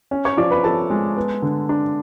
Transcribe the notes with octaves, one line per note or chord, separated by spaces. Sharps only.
C#4
C#5 C#6
F3 D5 D6
B4 B5
F3 A4 A5
G#3
B3
D3
D4